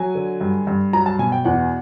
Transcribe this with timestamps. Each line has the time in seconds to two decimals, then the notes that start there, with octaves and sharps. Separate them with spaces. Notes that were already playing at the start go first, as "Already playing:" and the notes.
Already playing: F#3 G#5
0.15 D3
0.41 G2
0.67 G2
0.93 F#3 A#5
1.06 A5
1.19 B2 G#5
1.32 G5
1.45 E2 F#5